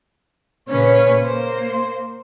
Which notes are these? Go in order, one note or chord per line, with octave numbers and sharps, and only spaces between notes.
A#2 C#3 C#4 B4 C#5
A#3 C5